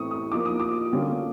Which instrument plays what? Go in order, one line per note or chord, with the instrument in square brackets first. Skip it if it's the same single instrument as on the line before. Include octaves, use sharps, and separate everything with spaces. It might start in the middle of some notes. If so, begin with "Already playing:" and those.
Already playing: [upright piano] A2 E3 A3 C4 C#6 D#6
D#6
F3 A#3 D#4 D6
D#6
D6
D3 G3 A#3 C#4 F4